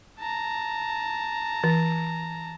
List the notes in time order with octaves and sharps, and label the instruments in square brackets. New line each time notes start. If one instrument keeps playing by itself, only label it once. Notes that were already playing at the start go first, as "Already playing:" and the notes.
[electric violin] A5 A#5
[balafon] E3